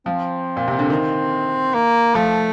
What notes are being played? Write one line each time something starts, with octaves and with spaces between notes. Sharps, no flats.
F3 C4
A#2
C3
D3
D#3 C4
A#3
F3 A3